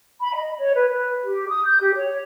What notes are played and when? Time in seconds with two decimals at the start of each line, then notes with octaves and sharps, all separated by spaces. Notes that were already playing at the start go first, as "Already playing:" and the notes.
0.20 B5
0.35 D#5
0.58 C#5
0.73 B4
0.90 B4
1.24 G4
1.47 D#6
1.64 G6
1.80 G4
1.95 C#5